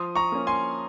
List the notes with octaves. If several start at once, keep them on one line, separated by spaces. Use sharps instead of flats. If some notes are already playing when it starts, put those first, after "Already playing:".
Already playing: F3 C6 D#6
A#5 C#6
A#3 C#4
G#5 C6